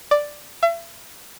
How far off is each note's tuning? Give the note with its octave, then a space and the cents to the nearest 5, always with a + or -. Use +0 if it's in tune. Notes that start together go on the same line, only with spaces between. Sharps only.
D5 +5
E5 +40